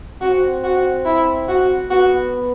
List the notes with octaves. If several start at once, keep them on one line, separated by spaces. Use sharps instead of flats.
C4 F#4
F#4
E4
F#4
B3 F#4